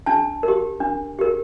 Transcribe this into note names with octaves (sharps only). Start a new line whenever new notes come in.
D4 A5
G4 A#4
D4
G4 A#4